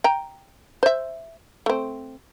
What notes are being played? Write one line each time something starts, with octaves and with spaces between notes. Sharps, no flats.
G5 A#5
C5 E5
A3 C4